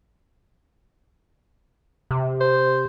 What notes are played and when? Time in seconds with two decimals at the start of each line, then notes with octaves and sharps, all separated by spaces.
2.11 C3
2.41 C5